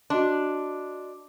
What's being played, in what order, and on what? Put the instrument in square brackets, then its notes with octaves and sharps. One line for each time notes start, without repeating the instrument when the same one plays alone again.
[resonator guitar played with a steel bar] D4 [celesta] F#4 D#5 C6